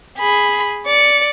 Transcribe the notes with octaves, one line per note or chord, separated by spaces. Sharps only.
G#4 B5
D5 C#7